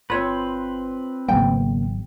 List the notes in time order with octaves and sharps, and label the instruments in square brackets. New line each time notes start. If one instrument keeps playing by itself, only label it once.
[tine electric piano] G1 [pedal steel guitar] C4 B4 [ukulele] F4 C#5
[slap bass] G#1 F#3 B3 [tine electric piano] C#3 A#3 [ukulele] G5